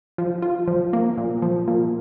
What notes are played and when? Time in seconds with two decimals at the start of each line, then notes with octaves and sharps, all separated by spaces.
0.18 F3
0.42 F4
0.68 F3
0.93 A#3
1.18 A#2
1.42 F3
1.68 A#2